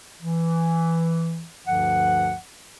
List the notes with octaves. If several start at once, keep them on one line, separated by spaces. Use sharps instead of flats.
E3
D2 G2 D3 F3 F#5